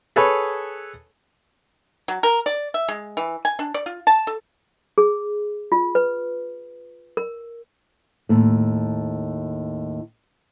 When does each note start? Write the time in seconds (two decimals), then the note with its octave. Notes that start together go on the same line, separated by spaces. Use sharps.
0.16 G#4 A4 B4 C#5
2.08 F#3
2.23 A#4
2.46 D5
2.74 E5
2.89 G#3
3.17 E3
3.45 G#5
3.59 D4
3.74 D5
3.86 F4
4.07 A5
4.27 A4
4.98 G#4
5.72 F4
5.95 B4
7.17 A#4
8.29 D#2 A2